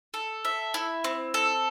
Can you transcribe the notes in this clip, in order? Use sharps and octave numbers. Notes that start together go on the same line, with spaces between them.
A4
E5
E4
C4
A4